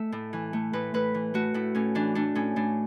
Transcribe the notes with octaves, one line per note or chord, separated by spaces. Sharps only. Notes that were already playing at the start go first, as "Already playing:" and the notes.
Already playing: A3 E5
A2
E3
A3
A2 B4
A2 B4
E3
A3 F#4
A2 E4
A2 C#4
E3 D4
A3 D4
A2 C#4
A2 D4